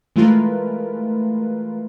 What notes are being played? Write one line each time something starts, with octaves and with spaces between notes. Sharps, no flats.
E3 G#3 A3 F4 A#4 B4